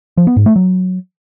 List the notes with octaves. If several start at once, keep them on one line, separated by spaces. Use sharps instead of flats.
F3
B3
G#2
A3
F#3